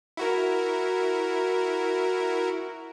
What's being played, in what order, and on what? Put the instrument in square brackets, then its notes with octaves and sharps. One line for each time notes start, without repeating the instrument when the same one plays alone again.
[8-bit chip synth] E4 F#4 A#4